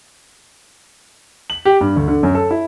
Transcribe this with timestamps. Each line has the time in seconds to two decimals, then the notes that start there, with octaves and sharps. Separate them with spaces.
1.50 F#7
1.65 G4
1.81 G2
1.96 D2
2.08 D3
2.23 F#2
2.35 A4
2.51 E4